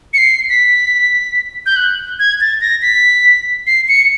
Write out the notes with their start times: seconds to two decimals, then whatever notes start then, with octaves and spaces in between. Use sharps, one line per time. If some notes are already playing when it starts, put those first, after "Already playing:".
0.14 C#7
0.18 C7
0.49 B6
1.66 G6
1.76 F#6
2.19 G#6
2.41 A6
2.61 A#6
2.82 B6
3.67 C7
3.88 C#7